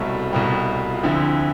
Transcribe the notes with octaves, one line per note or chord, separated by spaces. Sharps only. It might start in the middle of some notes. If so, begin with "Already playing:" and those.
Already playing: C2 B2 G3 A3 C4
C2 B2 G3
F4
D2 D3 F3 C4 E4